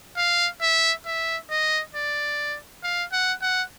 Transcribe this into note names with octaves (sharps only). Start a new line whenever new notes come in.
F5
E5
E5
D#5
D5
F5
F#5
F#5